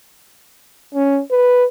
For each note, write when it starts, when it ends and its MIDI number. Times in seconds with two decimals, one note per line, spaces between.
0.95 1.21 61
1.31 1.65 71